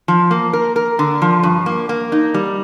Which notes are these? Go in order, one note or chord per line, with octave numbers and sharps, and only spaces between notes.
F3
A#3
A#4
A#4
D3
F3
G2
A#3
A#3
D#4
G3